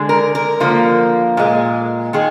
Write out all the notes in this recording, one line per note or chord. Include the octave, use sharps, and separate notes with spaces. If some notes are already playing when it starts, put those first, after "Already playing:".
Already playing: D3 G#3
A#4
A#4
D3 F3 A#3
A#2 G#3
D#3 G#3 G#4